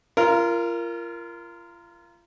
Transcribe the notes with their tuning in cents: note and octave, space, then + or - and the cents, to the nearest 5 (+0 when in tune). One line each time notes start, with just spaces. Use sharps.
F4 -30 A#4 +0